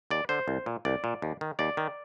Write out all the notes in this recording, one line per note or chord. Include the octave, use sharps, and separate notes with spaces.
D#2 D5
D3 C5
C2
A#2
C2 D5
A#2
D#2
D#3
D#2 D5
D#3